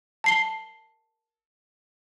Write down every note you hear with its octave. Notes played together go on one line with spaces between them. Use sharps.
A5 C7 G7